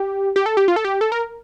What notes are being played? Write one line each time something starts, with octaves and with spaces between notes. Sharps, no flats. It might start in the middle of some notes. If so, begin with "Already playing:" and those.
Already playing: G4
G4
A4
G4
F4
A4
G4
A4
A#4